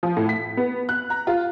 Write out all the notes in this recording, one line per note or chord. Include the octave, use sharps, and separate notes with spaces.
F3
A2
B6
B3
F#6
A#5
F4